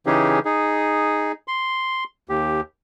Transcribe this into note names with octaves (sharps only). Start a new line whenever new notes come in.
C#3 E3 C#4 D#4 G4 G#4
D#4 G#4
C6
D#2 G4